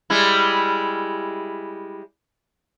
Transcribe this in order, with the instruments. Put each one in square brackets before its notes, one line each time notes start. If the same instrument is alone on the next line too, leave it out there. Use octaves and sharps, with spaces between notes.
[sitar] G3 G#3 E4